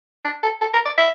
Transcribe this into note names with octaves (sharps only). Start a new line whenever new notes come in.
D4
A4
A4
A#4
D5
E5